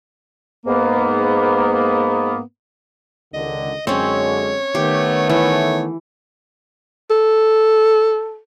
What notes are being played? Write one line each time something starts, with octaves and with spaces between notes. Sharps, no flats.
G#2 A#3 B3
C#2 D3 D#3 D#5
F#2 D3 G#3 C4 C#4 C#5
D#3 A3 B3 G4
E3 C#5
A4